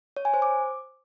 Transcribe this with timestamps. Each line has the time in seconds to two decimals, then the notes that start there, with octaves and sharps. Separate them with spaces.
0.17 C#5
0.25 G#5
0.34 C5
0.42 D6